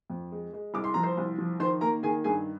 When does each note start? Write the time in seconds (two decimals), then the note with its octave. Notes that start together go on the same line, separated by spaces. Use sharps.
0.10 F2
0.32 G#3
0.53 G#3
0.74 C2 D6
0.84 C6
0.94 F3 A#5
1.03 C5 C6
1.17 C2
1.38 F3
1.60 D#3 C5 C6
1.81 A#3 A#4 A#5
2.03 D#3 G#4 G#5
2.24 G2 G#4 G#5